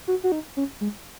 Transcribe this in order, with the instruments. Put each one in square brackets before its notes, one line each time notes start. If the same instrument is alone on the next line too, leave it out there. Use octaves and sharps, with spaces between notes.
[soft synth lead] F#4
F#4
D#4
C#4
G#3